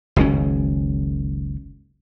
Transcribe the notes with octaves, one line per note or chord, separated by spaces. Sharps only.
F#1 C#2 D#3 C#4